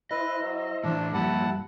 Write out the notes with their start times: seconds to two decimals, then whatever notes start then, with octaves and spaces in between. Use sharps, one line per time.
0.11 E4 B4 C5 D#5 E5
0.40 F#3
0.84 A2 E3 A3 D4
1.14 G2 F3 G3 A#3 E4 G4 F#5 A5